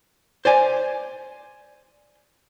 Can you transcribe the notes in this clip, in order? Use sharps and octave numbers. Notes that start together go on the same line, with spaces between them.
C5 D5 G#5